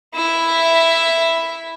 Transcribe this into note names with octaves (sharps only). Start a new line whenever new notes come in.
E4 E5